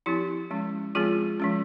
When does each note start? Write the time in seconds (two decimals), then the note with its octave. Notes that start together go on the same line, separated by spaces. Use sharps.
0.06 F3 C4 E4 G4
0.51 F3 G#3 C#4
0.95 F3 G#3 C4 F4 G#4
1.40 F3 G#3 C#4